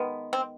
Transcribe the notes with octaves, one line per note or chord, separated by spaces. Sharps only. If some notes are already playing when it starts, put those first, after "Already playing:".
Already playing: D#3 G#3 B3
C4